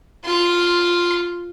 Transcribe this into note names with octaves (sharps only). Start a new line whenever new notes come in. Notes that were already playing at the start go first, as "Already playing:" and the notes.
F4 C6